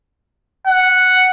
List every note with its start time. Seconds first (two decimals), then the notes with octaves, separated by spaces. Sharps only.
0.67 F#5